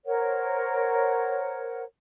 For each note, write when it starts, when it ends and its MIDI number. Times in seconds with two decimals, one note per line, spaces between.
0.05 1.83 70
0.05 1.83 72
0.05 1.83 73
0.05 1.83 78